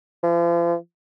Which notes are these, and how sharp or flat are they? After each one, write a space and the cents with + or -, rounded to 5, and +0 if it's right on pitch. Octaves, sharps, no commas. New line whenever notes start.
F3 -40